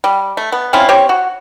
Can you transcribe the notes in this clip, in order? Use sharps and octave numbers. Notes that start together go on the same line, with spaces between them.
G3
A3
B3
C4 C#4 E4 F4
C4 G4 C5 C#5
F#4